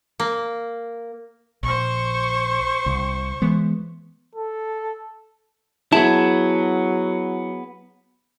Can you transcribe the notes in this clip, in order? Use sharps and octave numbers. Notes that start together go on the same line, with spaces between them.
A#3
A#1 C5 C#6
C2
E3 G#3 B3
A4
F#3 B3 E4 G#4 A5